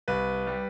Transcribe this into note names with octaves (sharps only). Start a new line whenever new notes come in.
C2 B4
G3